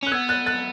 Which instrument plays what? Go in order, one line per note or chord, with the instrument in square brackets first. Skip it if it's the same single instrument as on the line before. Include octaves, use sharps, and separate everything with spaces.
[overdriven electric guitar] C#4 [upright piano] F#6
[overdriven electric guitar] B3 [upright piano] E6 G#6
[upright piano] F#6 A6
F#6 A6